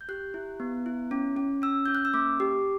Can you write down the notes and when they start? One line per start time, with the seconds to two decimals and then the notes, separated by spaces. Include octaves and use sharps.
0.01 G6
0.09 G4 F#6
0.34 E4
0.60 B3
0.86 E4
1.11 C#4
1.36 C#4
1.62 C#4 E6
1.86 C#4 G6
1.95 F#6
2.05 E6
2.14 A#3 D6
2.40 G4